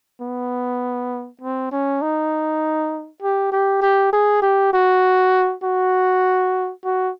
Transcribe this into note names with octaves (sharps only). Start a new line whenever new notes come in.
B3
C4
C#4
D#4
G4
G4
G4
G#4
G4
F#4
F#4
F#4